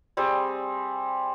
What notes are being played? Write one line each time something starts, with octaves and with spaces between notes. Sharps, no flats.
G3 C4 G#4